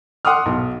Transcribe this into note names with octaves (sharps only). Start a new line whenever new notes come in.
F#5 C6 D6 D#6 F6
B1